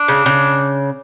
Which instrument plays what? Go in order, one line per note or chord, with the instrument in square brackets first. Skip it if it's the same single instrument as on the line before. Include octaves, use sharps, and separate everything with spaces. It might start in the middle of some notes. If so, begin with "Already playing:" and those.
Already playing: [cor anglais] D4
[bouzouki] C#3
C#3